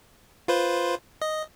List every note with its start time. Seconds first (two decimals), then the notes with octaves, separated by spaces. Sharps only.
0.48 F4 B4 C5
1.22 D#5